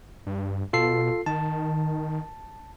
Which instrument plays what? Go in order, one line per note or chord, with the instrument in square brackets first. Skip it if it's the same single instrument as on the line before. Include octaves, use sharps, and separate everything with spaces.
[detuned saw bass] G2
[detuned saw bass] B2 [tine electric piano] F4 A4 C7
[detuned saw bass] D#3 [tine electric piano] A5